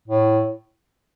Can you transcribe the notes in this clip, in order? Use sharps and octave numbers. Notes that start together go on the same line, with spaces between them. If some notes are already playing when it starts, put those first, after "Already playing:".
A2